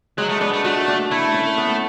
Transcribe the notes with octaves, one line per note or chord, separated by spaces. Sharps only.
F#3 G#3
A3
B3 D4
A3
A3 F#4
D4
A3 E4
C#4
B3